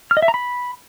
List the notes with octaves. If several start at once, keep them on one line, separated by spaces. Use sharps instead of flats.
F6
D#5
E5
A#5
B5